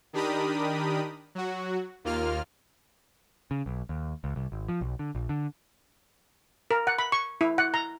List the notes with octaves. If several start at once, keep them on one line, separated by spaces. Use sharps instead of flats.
D#3 D4 G4 A#4 B5 D#6
F#3 F#4
D#2 A#3 F4 F6
C#3
B1
D#2
C#2
C2
G#1
F3
B1
D3
A#1
D3
A#4
F#5
B5
C#6
E4
F#5
A#5